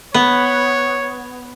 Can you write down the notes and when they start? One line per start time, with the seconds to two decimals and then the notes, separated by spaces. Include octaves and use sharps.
0.14 B3 C#5